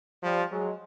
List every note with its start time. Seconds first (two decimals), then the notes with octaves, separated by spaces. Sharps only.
0.22 F3 G3
0.51 F#3 G#3